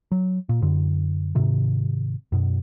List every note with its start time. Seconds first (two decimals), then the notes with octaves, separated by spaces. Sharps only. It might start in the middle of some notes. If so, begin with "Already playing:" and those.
0.12 F#3
0.49 A#2
0.62 F#2 D3
1.35 G#2 C3 D#3
2.32 F#2 B2